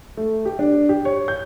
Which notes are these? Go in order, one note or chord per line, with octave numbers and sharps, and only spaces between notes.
A3
G4
D4
G4
C#5
G6